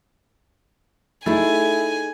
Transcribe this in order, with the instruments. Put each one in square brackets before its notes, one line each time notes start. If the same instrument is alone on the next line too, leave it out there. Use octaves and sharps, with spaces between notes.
[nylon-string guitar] A3 D#4 G#4 [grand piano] E4 [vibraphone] A4 [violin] G#5